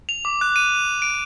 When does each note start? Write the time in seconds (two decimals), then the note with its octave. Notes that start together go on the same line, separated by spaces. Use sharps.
0.09 F7
0.25 D6
0.41 F#6
0.56 D#7
1.02 D7